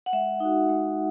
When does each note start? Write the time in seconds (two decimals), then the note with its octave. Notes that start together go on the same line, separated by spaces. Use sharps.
0.06 F#5
0.13 G#3 E5
0.40 D#4 F#4
0.69 G#3